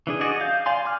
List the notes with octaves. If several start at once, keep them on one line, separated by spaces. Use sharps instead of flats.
E3 D4 G#4
F#4 G#4 D5 D#5
F5 G6
D5 F5 G#5 C6
G#5 D6 F6